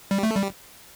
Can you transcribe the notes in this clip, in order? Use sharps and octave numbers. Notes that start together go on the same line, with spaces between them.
G3
A3
G3